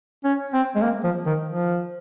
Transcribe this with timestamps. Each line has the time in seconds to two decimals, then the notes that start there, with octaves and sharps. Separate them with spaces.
0.24 C#4
0.53 C4
0.75 G#3
0.82 A#3
1.04 F3
1.26 D#3
1.48 F3